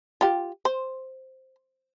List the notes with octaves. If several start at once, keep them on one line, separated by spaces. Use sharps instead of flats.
F4 G4
C5